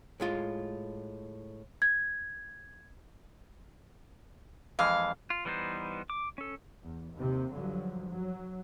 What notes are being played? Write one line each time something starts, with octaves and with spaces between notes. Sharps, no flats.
A2 G#3 F4
G#6
F2 E3 G#3 F5
F4
E3 G3 B3 D#4 C5
D6
C#4 A4
E2
D#2 C3
G2 D3 F3 F#3
F#3